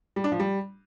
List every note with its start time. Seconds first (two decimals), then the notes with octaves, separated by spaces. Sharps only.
0.16 G3
0.24 D4
0.32 F3
0.40 G3